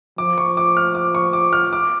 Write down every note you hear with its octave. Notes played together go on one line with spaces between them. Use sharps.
F3 D6
C#6
D6
F6
D6
C#6
D6
F6
D6